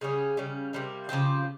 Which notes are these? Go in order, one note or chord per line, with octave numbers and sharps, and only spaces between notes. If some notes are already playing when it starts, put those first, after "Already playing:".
C#3 G3 C#4 G#4
C#3 G3 C#4
C3 G3 A#3
C#3 F3 C4 G4